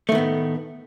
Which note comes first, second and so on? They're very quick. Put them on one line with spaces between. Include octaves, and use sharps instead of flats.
A3 D#3 B3 A2